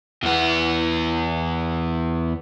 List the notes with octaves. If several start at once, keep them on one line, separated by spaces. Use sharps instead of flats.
E2 B3